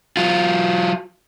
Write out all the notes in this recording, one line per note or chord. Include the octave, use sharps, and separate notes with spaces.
F#3 F4